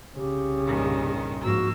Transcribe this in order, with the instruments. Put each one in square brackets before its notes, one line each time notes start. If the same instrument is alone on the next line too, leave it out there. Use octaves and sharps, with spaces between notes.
[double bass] C2 C#3 [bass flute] G4
[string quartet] G2 A#2 D#3
[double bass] G#2 F3 [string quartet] A#3 E6 [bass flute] F#4